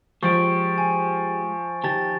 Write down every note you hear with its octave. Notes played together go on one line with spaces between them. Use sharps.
F3 G#3 G4 C#5 C#6 D7
G#5
D#3 G4 A5 A6